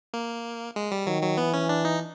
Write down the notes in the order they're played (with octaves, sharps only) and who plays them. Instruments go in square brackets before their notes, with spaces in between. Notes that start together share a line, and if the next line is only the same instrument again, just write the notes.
[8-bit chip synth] A#3
G#3
G3
[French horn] D#3 [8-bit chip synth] F#3
[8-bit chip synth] F#3
[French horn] E3 [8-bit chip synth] B3
[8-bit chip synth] C#4
D4
D#4